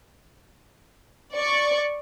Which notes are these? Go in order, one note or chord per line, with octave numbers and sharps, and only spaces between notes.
D5 C#6